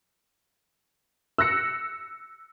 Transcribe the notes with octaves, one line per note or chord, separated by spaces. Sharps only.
E6 F#6 A#6 C#7